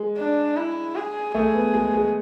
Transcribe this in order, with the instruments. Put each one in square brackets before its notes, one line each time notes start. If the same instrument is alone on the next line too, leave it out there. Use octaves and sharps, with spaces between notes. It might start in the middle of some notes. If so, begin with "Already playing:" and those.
Already playing: [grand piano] G#3
[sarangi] D4
E4
G#4
[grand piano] A3 [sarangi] G#4
[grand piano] B3
G#3
G#3